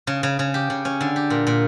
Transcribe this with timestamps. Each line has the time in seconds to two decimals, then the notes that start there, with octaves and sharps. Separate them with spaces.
0.07 C#3
0.23 C#3
0.39 C#3
0.54 G4
0.70 C#3
0.85 C#4
1.01 D3
1.16 G4
1.30 A#2
1.47 A#2